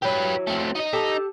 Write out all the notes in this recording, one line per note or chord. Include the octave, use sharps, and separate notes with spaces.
E3 F#3 G4 B4
A3 C4
D#4 D#5
G4 A4 A5